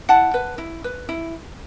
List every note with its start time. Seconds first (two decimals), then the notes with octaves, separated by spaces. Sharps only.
0.09 E4 F#5 A5
0.34 B4
0.58 E4
0.84 B4
1.09 E4